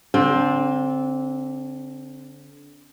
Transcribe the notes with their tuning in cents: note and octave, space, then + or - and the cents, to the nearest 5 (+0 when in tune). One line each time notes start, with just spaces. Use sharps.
D3 -30 C4 +5